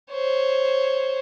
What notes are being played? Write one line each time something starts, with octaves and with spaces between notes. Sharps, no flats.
C5 C#5